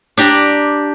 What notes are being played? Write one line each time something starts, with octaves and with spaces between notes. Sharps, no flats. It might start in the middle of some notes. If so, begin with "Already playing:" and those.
D4 G4 A#5